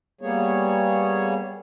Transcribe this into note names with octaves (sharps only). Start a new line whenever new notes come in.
G3 A#3 B3 G#4 C#5